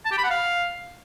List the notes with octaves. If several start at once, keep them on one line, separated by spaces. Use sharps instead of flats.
A5
G4
B5
F#5
F5